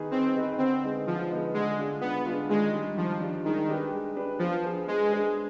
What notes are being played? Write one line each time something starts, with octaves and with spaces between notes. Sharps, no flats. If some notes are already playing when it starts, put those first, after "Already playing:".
Already playing: D#3 B3 D#4 G#4 B4
D#3 C4
B3 D#4 G#4 B4
D3 C4
G#3 B3 D#4
D3 F3
G#3 B3 D#4
D3 G#3
G#3 D4 F4
D3 B3
G#3 D4 F4
D#3 G#3
G3 D4
D#3 F3
G3 D4
D#3 G#3
D4 G4 B4
G#3
D4 G4 B4
F3 B3
D4 G#4 C5
G#3 B3
D4 G#4 C5